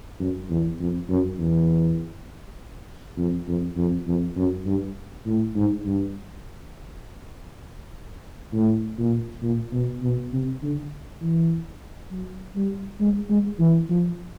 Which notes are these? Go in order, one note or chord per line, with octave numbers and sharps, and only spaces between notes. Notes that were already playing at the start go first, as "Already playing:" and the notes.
F#2
E2
F2
F#2
E2
F2
F2
F2
F2
F#2
G2
A2
G#2
G2
A2
A#2
A#2
B2
B2
C3
D3
E3
F#3
G3
G#3
G#3
E3
F3